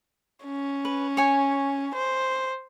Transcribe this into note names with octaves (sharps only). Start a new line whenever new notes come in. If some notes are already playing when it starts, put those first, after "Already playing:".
C#4
B4
C#5 G#5
C5